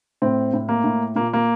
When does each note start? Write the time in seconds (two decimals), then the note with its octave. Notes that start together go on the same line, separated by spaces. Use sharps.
0.22 A2 C4
0.54 A2
0.69 A#3
0.84 A2
1.16 A#2 A#3
1.33 A#3